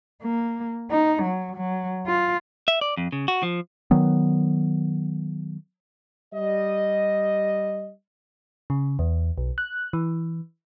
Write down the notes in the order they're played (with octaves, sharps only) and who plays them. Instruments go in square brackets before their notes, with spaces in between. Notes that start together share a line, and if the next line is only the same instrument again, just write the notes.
[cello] A#3
D#4
F#3
F#3
F4
[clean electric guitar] E5
D5
F2
C#3
F#4
F3
[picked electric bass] D#3 F#3 B3
[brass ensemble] G3 D#5
[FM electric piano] C#3
E2
B1
F#6
E3